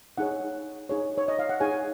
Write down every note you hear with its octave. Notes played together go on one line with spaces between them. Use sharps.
D#4 G#4 C#5 F#5
D#4 G#4 C#5
C#5
D#5
F5
F#5
D#4 G#4 C#5 G#5